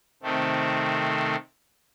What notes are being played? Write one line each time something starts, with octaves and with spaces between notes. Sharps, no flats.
C3 D#3 A3 C4